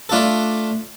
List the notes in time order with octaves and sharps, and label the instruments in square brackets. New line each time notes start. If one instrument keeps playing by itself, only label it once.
[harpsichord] A3 D4 F4 A4